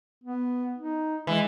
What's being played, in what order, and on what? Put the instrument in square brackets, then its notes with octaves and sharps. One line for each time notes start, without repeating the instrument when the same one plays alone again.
[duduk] B3
D#4
[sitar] E3 [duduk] G#3